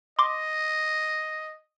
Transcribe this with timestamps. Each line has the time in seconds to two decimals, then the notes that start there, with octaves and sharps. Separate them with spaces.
0.19 D#5 C6 D6